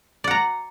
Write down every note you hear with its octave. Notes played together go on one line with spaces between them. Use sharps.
D5 F#5 A#5